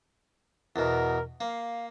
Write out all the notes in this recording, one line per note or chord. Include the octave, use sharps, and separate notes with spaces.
E2 B2 A#4
A#3 F5